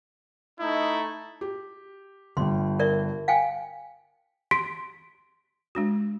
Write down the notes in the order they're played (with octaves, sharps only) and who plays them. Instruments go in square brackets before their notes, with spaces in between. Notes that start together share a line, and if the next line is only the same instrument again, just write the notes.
[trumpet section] A3 D#4 [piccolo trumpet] E4
[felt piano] G4
[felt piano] G1 G3 [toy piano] C6
[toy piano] A#4 D5 E5
F5 G5 G#5
[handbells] C6 B6 D7
[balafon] G#3 D4 F#4